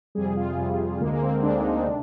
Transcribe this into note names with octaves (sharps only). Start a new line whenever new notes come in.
F2 C3 G3 G#4
F4
F2 C3 G3
D2 D3 G#3 A#3
A#3
C4
D2 D3 G#3 D4
D#4
D4
C3